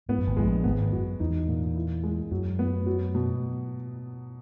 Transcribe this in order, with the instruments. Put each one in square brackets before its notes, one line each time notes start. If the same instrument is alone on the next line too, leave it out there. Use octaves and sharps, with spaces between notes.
[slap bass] G#2 [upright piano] B3
[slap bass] F#2
G#1 G#2
[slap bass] A#1 A#2 [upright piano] G#3
[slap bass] G#1 G#2 [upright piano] B3
[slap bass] F#2 [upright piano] F#4
[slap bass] E2 [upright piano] D#4
[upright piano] A#2
E4
G#3
[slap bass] F#2 [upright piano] F#3
[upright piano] B3
F#3
B2